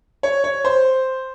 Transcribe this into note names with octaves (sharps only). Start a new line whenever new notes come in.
C#5
C#5
C5